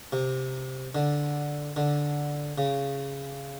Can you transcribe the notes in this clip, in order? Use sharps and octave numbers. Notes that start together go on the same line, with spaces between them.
C3
D3
D3
C#3